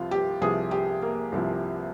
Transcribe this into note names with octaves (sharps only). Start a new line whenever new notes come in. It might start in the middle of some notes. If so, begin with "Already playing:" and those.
Already playing: C2 C3 F3 F4
G4
C2 C3 F3 G#4
G4
A#3
C2 C3 F3